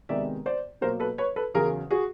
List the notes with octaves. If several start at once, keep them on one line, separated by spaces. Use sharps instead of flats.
C3 D#3 G#3 B3 D5 E5
C5 D5
B2 F#3 A#3 A#4 C5
A4 B4
B4 C#5
A4 B4
E2 C#3 F#3 G#4 A#4
F#4 G#4